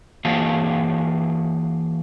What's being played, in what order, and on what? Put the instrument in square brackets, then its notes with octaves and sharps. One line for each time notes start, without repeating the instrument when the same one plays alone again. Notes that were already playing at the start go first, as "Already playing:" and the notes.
[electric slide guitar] E3 A#3 F#4 G#4 F5 A5